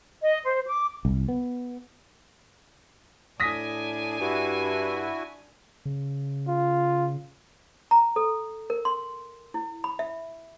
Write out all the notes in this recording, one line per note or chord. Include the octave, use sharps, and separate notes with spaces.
D#5
C5
D6
C2
B3
A2 D4 G#5 D#6 A#6 B6
G2 E4 F#4
C#3
F4
A#5
A4
A#4
C6
E4
B5
E5